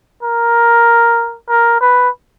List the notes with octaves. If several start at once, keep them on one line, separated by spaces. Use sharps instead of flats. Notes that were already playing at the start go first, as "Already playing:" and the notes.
A#4
A#4
B4